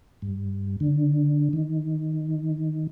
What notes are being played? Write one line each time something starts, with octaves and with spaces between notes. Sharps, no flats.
G2
D3
D#3